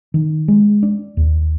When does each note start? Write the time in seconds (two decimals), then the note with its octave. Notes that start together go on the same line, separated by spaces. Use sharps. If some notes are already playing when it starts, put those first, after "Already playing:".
0.14 D#3
0.48 G#3
0.83 D4
1.17 D#2